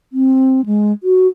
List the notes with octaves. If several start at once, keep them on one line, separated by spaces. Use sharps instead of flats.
C4
G#3
F#4